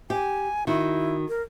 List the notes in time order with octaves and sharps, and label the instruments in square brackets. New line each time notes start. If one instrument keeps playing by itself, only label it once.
[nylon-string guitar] G4 [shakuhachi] G#5
[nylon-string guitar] D#3 F#4 [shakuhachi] E4
[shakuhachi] A#4